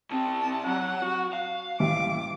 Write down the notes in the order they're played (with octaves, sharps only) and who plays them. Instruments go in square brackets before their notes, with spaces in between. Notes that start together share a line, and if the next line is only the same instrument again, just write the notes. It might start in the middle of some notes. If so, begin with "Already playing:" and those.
[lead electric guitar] C2 C4 [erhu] A5
[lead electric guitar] F#3 [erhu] F#5
[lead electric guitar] F#4
F5
[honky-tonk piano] A1 G3 E5 [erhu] D6